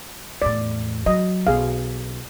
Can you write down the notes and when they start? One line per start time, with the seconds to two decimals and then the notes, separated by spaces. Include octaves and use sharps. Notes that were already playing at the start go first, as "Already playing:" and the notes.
0.42 E2 A2 D5
1.06 F#3 D#5
1.47 B1 G#4 F5